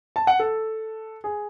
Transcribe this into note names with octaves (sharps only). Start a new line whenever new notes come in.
A5
F#5
A4
G#4